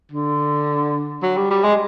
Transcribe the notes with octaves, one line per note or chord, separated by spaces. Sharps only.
D3
F#3
G3
G3
G#3